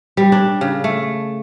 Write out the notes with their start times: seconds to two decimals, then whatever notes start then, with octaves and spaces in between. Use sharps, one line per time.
0.17 G3
0.32 D4
0.61 C#3
0.84 A3